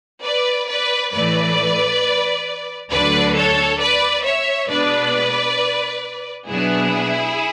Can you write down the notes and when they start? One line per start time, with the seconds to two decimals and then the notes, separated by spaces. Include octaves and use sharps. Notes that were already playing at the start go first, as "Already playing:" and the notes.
0.23 B4 D5
0.68 B4 D5
1.12 A2 E3 A3 B4 D5
2.91 D2 D3 F#3 A3 D4 B4 D5
3.36 A4 C#5
3.80 B4 D5
4.25 C#5 E5
4.69 B2 G#3 B3 D4 B4 D5
6.47 B2 F#3 B3 D4 E4 G#4